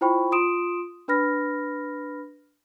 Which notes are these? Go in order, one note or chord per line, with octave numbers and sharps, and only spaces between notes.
E4 F4 C5 G5 B5 C#6
F4 C6 D#6 D7 E7
D4 B4 B5 F6 A#6